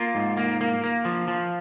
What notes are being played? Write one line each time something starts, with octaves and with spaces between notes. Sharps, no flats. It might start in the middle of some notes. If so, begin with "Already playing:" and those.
Already playing: A#3 F4
G#2
A#3
A#3
A#3
F3
F3